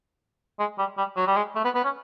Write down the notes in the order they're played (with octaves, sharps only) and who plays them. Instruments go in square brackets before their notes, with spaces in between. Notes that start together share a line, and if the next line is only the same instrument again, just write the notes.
[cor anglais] G#3
G3
G3
F#3
G3
G#3
A3
B3
B3
C#4